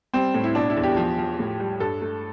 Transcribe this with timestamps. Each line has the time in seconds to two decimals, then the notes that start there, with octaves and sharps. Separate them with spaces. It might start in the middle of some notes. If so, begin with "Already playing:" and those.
0.14 G3 C4
0.34 A2
0.44 E4
0.55 B2 D4
0.70 E4
0.76 E2
0.83 G4
0.97 F3
1.18 F3
1.39 A2
1.60 G3
1.80 G2 A4
2.01 A3